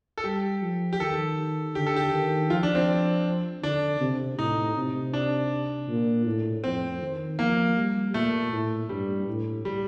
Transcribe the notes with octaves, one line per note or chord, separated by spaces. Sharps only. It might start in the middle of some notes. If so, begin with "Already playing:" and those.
A4
G3 G4
F3
G4
D#3 A4
D3 G4
A4
G4
D#3
F3 F4
D4
C4
D3 D4
C3
A2 D#4
C3
D4
A#2
A2
F2 C4
D#3
F3 A#3
G3
A#2 A3
A2
G2 G3
A2
G3